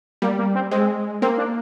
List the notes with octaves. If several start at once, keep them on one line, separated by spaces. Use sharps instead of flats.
G3 A#3
A#3
C4
G#3 C4
A#3 C4
D4